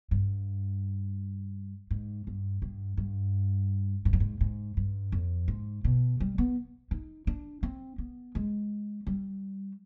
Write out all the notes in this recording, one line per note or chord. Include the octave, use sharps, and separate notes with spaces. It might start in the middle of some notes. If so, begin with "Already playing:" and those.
G2
G#2
G2
G2
G2
G#2
G2
G#2
G#2
G2
F2
G#2
B2
G3
B3
D#4
D4
C4
B3
G#3
G3